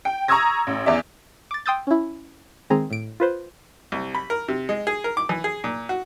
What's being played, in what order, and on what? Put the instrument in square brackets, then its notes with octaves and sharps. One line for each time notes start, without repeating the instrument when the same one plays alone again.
[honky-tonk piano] G5
A#5 C#6 D#6 E6 G#6 A#6
A1
E2 D5 E5
[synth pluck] D6 A6
G5 C6 D#6 E6 G6 A6
C#4 E4
D#3 G#3 C4 G#4 A#5
A2 D7
F4 B4 C5
[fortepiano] C2
B5
A#4
C3
G#3
G#4
A#4
D6
E3
G#4
A#2
F#4